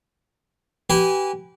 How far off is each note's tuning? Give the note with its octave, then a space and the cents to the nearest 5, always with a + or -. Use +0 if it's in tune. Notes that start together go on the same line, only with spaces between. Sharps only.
G4 -30 B4 +0 G#5 -25